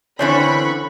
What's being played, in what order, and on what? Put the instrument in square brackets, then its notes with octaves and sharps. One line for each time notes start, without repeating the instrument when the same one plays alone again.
[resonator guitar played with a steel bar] D3 E3 C4 [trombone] C#4 [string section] B5 C#6